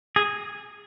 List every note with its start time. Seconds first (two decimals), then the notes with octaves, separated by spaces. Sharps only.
0.16 G#4